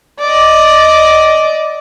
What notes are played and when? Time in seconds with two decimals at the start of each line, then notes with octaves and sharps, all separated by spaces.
0.19 D5 D#5